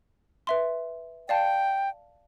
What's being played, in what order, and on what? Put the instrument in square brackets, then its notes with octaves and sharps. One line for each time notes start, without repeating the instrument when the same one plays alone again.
[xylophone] B4 E5 C6
[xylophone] D5 F5 A5 [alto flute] G5